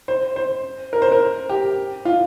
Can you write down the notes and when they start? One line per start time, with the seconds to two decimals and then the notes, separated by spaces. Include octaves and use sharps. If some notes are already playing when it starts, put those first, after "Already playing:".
0.08 C5
0.36 C5
0.93 A#4
1.02 C5
1.12 A#4
1.49 G4
2.05 F4